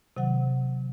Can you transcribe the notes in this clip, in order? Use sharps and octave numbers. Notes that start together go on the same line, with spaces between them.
C3 D#3 F#3 F#5